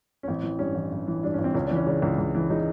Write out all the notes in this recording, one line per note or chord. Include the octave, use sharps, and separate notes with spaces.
C#4
A1 C4
E3
G2 C#4
A1
A1
E3
G2 D4
A1 C#4
C4
C#2 C#4
D4
E3
C#4
C#3 D4
C#2
C#2
E3
C#3 D#4